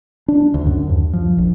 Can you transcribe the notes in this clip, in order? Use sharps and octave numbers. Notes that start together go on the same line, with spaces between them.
D4
D2
F#2
D#2
F3
A#1